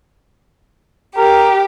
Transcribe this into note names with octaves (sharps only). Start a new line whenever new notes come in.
G4 A#4